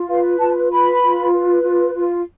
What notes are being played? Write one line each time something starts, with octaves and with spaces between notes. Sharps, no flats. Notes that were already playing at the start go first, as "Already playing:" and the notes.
Already playing: F4
B4 F5
F4 A5
B4 B5
F4
B4
F4
F4